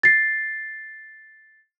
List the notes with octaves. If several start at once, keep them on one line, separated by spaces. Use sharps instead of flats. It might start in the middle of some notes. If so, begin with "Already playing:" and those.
A6 C7